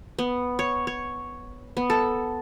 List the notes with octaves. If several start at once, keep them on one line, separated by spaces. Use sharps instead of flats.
B3
C#5
C#5
B3
A4